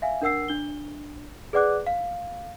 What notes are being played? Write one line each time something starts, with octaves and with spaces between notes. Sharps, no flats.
E5 F5 G#5
D4 A#4 F#5 E6 C7
D4 G7
G#4 B4 D5 F#5 D6 F#6
F5